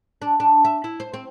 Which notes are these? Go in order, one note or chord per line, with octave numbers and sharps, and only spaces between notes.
D4
D4
E5
E4
C5
C4